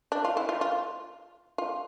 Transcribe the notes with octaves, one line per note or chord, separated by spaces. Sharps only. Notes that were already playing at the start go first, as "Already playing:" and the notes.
D4
F4
E4
F4
F4
F4